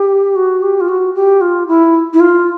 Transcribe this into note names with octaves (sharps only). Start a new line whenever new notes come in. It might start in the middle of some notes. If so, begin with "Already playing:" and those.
Already playing: G4
F#4
G4
F4
F#4
G4
F4
E4
E4
F4